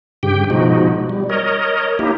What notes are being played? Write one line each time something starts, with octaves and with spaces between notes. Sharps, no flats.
G2 C#3 G4 G5
B2 F3 G#3 D#4 F#4
G3
A#4 C#5 D#5
A#3 D#4 E4 G4